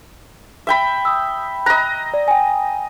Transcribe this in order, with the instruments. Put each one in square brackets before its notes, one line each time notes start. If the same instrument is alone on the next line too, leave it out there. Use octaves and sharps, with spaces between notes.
[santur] E5 G5 B5
[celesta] D#6 E6
[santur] D#5 A#5 [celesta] F#6
[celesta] D5
G5 G#5